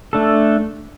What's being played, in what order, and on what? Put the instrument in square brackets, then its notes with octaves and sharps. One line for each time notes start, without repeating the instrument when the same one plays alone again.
[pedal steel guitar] A3 D4 A4